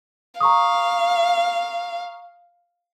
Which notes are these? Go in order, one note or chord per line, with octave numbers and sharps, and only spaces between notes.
F5 A#5 C#6 D#6